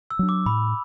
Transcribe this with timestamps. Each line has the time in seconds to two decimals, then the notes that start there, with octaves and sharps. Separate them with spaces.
0.11 E6
0.19 F#3 D4
0.29 D6
0.46 A2 B5